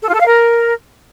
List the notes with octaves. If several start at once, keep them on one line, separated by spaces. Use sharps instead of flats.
A4
F4
A4
F5
A#4